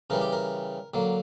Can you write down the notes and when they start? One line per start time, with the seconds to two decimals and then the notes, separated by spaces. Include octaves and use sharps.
0.10 C#3 E3 G3 A#4
0.21 G4
0.33 A#4
0.94 D3 F#3 A#3